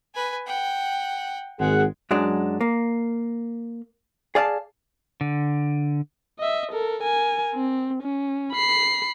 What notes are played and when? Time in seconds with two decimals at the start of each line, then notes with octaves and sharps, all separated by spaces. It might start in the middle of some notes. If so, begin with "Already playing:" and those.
0.14 B4 G#5
0.46 F#5 G5
1.60 G#1 G#3 G#4 F#5
2.11 F#2 F#3 G#3 D4
2.61 A#3
4.35 G#4 D5 F5 A5
5.21 D3
6.39 D#5 E5
6.72 A4 A#4
7.03 A#4 G#5
7.55 C4
8.03 C#4
8.52 B5 C7